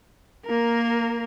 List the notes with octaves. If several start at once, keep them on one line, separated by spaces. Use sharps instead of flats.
A#3 A#4